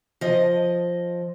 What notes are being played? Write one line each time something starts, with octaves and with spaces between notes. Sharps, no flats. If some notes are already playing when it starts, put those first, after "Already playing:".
F3 D#5